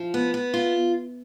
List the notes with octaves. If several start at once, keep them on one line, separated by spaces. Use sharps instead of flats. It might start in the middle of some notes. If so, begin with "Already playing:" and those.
Already playing: F3
B3
B3
F4